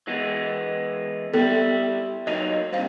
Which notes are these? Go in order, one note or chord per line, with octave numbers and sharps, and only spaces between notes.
E3 G#3 B3
G3 B3 E4 A4
F#3 A#3 D#4 D#5
G2 C3 C5 F5